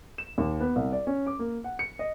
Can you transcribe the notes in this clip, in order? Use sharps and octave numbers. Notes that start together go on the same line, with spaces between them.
E7
D#2
B3
C2
D5
C#4
D6
A#3
F#5
C#7
D#5